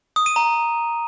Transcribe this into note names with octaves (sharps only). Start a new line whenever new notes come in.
D#6
D#7
A#5